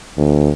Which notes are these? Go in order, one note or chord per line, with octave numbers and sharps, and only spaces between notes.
D2